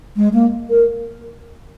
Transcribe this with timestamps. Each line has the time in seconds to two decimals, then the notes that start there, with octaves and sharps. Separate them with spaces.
0.16 G#3
0.33 A#3
0.70 A#4